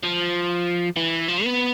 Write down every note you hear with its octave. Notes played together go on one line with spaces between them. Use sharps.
F3
E3
F3
B3